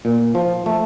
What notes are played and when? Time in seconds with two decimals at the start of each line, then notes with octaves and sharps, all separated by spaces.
0.05 A#2
0.35 F3
0.66 A3